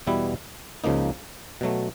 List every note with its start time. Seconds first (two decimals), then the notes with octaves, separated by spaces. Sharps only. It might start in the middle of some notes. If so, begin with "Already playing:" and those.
0.07 E2 B2 G3 B3 E4
0.84 C#2 C#3 F3 A#3 D#4
1.61 B2 F#3 A3